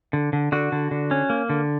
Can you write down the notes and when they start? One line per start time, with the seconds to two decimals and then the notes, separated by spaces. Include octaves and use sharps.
0.13 D3
0.33 D3
0.52 D3 F#4
0.72 D3
0.91 D3
1.11 C#4
1.30 A#3
1.50 D3